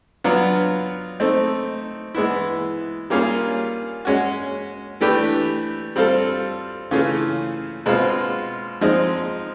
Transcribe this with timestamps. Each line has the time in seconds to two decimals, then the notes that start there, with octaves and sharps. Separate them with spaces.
0.24 F#3 B3 D4 F4
1.20 A3 C4 D#4
2.15 E3 G#3 B3 E4
3.10 G3 A#3 C#4 F4 G#4
4.05 G#3 C#4 F#4
5.01 E3 A3 D4 G4 B4
5.96 G3 C4 F4 A4
6.91 C#3 E3 A3 C#4 F4
7.86 B2 G#3 C4 F4
8.81 F3 G#3 C4 D#4